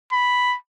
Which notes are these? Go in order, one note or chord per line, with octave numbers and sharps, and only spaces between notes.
B5